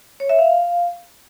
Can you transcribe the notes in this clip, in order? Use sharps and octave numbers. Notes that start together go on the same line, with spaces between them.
C#5
E5
F5